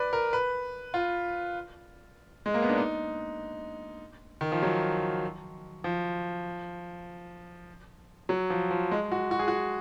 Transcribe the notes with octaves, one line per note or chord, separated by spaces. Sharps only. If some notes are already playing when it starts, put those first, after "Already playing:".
Already playing: B4 D5
A#4
B4
F4
G#3
A#3
B3
D4
D#4
D#3
F3
F#3
F3
F#3
F3
F3
G#3
F#4
F#4
G#4
F#4